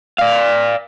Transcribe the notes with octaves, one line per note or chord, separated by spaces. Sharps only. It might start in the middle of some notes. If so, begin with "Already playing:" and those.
D5 F5